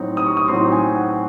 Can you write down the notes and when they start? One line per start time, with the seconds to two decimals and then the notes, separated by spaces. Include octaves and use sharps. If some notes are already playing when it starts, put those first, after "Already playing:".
Already playing: A2 F#3 C4 D#4
0.17 D#6
0.26 C#6
0.37 D#6
0.48 A2 F#3 C4 D#4 C6
0.72 G#5
0.96 F#5